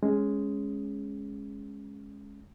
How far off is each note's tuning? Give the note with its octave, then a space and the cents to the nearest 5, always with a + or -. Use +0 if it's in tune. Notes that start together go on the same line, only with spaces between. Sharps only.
G#3 +0 C#4 +0